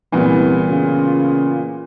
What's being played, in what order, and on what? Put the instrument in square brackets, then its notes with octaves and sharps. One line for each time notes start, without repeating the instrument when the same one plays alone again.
[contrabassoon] C2 [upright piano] A#2 E3 B3
[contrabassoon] C#3 [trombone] F4